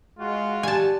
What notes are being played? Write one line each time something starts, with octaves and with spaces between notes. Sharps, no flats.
G#3 F4 F#4
G4 D5 G#5 A5